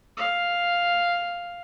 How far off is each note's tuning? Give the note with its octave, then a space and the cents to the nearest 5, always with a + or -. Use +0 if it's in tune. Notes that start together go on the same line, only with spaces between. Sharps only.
F5 +0